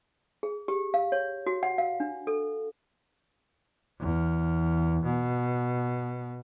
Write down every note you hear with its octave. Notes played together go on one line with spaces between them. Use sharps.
G#4
G4
F5
C#5
F#4
F#5
F5
D4
A4
E2
B2